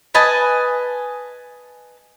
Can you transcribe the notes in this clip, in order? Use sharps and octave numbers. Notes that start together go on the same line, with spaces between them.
B4 D#5 G#5 A5